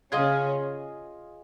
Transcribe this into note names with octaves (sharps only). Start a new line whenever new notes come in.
C#3 C#4 F4 G#4 D#5